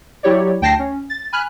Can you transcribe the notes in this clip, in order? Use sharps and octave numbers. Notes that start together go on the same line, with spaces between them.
F#3 E4 G4 C#5 D5
D2 G5 A5 A#6 C7
C#4
A6
G#5 B5 F6 F#6